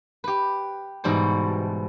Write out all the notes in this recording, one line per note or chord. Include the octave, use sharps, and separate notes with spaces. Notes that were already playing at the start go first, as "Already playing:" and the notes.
G4 B4
G#2 B2 E3 G3 F#4 C5